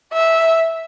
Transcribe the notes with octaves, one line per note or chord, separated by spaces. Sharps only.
E5